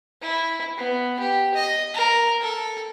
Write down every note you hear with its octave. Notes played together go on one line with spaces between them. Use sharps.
E4
B3
G4
D#5
A#4
A4